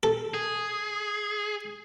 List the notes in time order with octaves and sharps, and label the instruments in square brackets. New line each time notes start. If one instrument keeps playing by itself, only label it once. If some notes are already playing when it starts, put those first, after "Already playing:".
[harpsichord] A4
[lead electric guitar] G#4